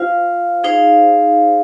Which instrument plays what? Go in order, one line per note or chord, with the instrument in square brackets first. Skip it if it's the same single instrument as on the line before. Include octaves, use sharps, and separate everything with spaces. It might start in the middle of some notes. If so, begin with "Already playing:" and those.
Already playing: [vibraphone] F4 C5 F5
D#4 G#4 C5 F5